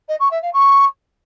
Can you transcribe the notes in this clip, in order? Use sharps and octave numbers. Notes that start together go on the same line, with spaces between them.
D#5
C#6
E5
F5
C#6